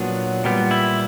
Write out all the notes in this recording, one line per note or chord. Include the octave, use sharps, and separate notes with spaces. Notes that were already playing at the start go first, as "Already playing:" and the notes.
Already playing: A#2 F#3 B3 D4
A#2 G3 B3
E4